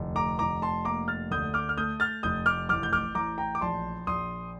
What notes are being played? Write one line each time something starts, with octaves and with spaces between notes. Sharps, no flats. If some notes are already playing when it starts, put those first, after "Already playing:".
Already playing: F1 D2
A#5 D6
F1 A#5 D6
A5 C6
A#3 A#5 D6
F6 A6
D2 D#6 G6
D6 F6
F6
A3 D#6 G6
F6 A6
F1 D#6 G6
D6 F6
A1 D6 F6
G6
D6 F6
A1 A#5 D6
G5 A#5
D6
A#1 A5 C6
A#1 C6 D#6